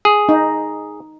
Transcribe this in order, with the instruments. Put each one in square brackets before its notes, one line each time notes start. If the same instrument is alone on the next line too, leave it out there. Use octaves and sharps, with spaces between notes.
[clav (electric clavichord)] G#4
[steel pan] D#4